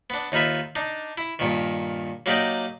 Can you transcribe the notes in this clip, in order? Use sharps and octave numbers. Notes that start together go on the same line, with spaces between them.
B3 D4
D#2 D#4 F4 B4 E5
D4 D#4
E4
G2 A#2 D#3
F#3 A#3 D#4 G4 D5 D#5